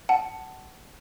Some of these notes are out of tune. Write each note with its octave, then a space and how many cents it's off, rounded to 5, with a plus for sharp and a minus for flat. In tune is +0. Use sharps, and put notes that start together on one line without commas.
F#5 +25 A5 +0